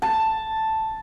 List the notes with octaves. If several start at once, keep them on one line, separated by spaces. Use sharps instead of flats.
A5